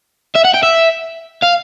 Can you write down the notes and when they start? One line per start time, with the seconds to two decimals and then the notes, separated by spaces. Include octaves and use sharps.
0.36 E5
0.45 F#5
0.54 G5
0.63 E5
1.43 F5